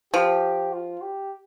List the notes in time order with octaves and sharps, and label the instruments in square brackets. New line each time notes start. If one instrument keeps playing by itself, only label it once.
[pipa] F3 [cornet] G4
[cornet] F4
G4